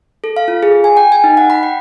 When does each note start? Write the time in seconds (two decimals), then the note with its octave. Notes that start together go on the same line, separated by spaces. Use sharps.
0.24 A4
0.36 F5
0.48 F4
0.63 G#4
0.84 G#5
0.97 G5
1.12 G#5
1.24 D#4
1.37 F#5
1.50 B5
1.63 G5